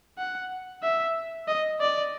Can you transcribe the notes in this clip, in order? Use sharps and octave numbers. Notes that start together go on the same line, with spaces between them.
F#5
E5
D#5
D5